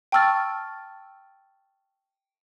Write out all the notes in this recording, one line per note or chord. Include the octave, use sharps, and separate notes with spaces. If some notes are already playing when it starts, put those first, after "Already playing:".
G5 A5 C#6 E6 F6 A6